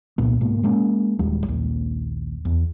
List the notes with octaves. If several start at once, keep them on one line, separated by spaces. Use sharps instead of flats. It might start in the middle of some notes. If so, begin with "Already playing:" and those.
C2 A#2 B3
G#2 B2 A#3
G#3 A#3 C#4
D#1 D#2 G3 G#3
A#1 D#2
E2